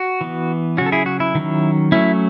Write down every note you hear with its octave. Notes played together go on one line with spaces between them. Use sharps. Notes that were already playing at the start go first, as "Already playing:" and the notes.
Already playing: F#4
E3 B3
C#3 F#3 C#4 F#4
A4
E4 G#4
F#4
E4
D#3 F#3 C#4
F#3 A3 C#4 E4